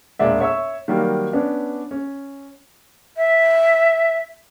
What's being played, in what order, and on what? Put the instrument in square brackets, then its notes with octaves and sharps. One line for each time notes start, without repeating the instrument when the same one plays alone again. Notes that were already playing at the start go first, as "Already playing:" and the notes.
[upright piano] E1 A#2 G#3 D5 E5
C#5 E5 C#6 E6
D#3 F#3 G3 A#3
B3 C#4 D4
C#4
[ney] E5